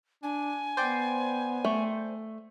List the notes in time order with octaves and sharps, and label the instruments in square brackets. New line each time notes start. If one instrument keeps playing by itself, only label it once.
[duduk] D4 [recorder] G#5
[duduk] B3 [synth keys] C5 D5 G5
[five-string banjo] A3